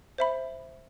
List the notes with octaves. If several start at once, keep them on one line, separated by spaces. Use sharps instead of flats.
C5 E5 B5